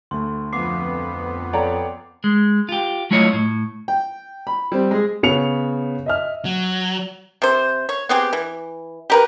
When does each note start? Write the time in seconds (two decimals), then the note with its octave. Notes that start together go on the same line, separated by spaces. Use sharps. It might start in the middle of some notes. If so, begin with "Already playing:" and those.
0.11 D2 A3 C6
0.53 F2 B3 F5 D6 C7
1.53 A4 C#5 D5 F#5 G5 A#5
2.24 G#3
2.69 F4 G4
3.11 F#3 A3 E4 F4 C#5 D#5
3.33 A2
3.88 G5
4.47 B5
4.72 G3 C4
4.91 G#3 G#4
5.23 C#3 B3 C#5 C#7 F7
6.06 D#5 E5 F6
6.45 F#3
7.42 C3 C5
7.89 C#5
8.09 B3 C4 G4 G#4
8.33 E3
9.10 G4 A#4 B4